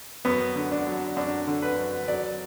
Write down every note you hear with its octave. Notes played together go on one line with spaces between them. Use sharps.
F#2 B3
D3
D4
F#3
F#2 D4
D3
B4
F#2
F#3 D5